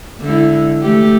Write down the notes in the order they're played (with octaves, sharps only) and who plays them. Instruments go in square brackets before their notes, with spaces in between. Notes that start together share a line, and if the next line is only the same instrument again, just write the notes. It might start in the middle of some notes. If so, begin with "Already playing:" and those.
[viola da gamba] D3 G#3 E4
E3 A3 G4